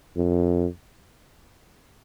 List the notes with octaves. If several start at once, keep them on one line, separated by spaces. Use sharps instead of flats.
F2